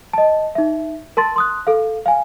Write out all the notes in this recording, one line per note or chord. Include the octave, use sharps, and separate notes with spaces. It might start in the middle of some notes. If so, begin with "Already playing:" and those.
D#5 A5
D#4 E5
A#4 A5 C6 A6
C6 D#6 F#6
A4 F5
F5 G#5